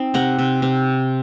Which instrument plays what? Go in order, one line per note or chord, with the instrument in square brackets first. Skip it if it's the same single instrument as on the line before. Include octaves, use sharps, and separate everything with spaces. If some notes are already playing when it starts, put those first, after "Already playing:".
Already playing: [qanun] C4 D#4
C3 F#5 A#5
C3
C3